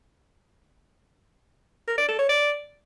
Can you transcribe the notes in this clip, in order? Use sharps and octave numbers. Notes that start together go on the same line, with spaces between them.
A#4
D5
A4
C#5
D5